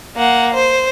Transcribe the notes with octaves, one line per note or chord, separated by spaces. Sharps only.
A#3 F#5
C5